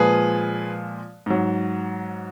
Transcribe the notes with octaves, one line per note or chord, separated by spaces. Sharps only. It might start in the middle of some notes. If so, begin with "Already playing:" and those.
Already playing: A#2 F3 G#3 G#4 B4
G#2 F#3